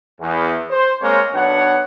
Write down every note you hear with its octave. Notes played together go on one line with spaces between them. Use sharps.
E2
C5
G#3 A#3 C4 A#4 C#5
B1 B3 D4 C#5 F#5